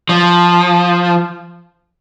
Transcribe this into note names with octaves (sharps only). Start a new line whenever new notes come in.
F3